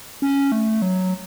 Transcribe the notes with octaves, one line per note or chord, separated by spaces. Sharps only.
C#4
A3
F#3